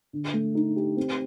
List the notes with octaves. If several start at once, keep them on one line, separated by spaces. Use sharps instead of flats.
D3
A3
D#4
G4
C4